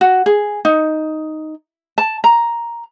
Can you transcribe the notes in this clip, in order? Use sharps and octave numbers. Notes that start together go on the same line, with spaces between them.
F#4
G#4
D#4
A5
A#5